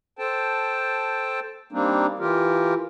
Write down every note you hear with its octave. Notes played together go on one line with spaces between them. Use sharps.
A4 C5 G5 A5
G3 A#3 C4 D4 D#4
E3 F4 G4 A#4